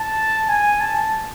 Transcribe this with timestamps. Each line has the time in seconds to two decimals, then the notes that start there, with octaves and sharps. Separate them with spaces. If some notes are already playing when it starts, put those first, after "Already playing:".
Already playing: A5
0.48 G#5
0.80 A5